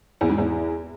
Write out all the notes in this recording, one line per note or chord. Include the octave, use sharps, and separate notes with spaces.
E2
G#2
E2